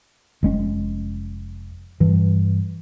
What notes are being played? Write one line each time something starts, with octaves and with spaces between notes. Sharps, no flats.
F1 G#3 C#4
G2 E3